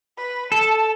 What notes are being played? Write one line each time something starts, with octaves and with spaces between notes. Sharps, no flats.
B4
A4 A5